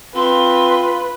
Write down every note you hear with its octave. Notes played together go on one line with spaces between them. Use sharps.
C4 F4 B4 C6